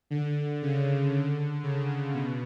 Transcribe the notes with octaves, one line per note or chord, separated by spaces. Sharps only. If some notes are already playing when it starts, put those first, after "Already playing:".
D3
C#3
D3
C#3
B2